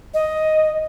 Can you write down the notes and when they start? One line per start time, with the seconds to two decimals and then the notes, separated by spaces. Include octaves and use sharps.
0.14 D#5